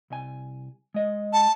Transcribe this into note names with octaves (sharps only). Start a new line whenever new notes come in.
C2 G#5
G#3 D#5
A5